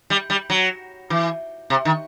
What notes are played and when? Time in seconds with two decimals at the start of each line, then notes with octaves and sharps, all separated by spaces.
0.10 G3
0.30 G3
0.50 F#3
1.10 E3
1.70 C3
1.85 D#3